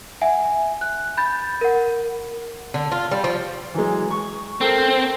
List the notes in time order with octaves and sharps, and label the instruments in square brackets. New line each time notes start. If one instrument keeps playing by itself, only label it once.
[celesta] E5 F#5 G#5
F#6
B5 G6 A6
A#4 F#5
[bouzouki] D3
F4
G3
F3
[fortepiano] E3 F#3 G#3
C#6
[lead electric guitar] C4 [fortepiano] A4 A#4